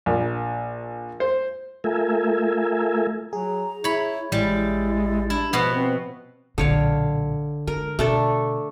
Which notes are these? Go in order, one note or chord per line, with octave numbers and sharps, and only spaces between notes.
A#1
C5
A3 F4 A4 A#4 E5 G#5
F#3 G#4 A#5
E4 C#5 B5
A1 G3 G#3 E4 A6
D4 E4
B2 F3 B3 B4
C4
B1 A#2 D3 C#5 F5
G#3 A#4
B2 A3 D4 A4